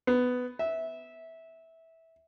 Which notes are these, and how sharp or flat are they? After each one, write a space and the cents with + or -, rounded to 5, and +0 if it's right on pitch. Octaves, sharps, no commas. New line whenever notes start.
B3 +10
E5 -15